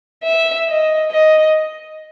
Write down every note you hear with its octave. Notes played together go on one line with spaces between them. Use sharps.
E5
D#5
D#5